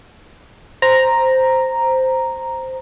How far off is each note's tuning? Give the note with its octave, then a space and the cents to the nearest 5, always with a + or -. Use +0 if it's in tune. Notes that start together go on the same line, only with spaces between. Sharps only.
C5 -5 A#5 +0